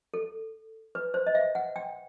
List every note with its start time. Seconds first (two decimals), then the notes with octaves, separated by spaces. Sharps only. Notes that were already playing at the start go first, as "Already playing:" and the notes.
0.14 A4
0.95 B4
1.14 C5
1.27 D#5
1.35 E5
1.55 F#5
1.76 G5